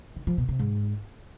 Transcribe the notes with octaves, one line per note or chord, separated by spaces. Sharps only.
D#3
F3
B2
C3
G#2